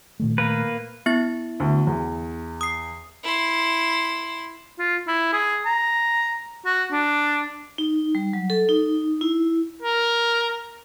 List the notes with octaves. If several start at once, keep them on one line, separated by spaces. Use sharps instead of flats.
A#2 D#3 A3
A#3 B4
B3 E4 A6
D2
E2
D#6 C7
E4 C6
F4
E4
G#4
A#5
F#4
D4
D#4
G3
F#3
A4
D#4
E4
A#4